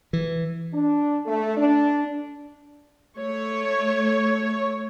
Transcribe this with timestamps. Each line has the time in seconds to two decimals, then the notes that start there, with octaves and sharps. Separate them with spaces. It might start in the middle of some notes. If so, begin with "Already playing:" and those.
0.13 E3
0.73 D4
1.26 A3
1.57 D4
3.16 A3 C#5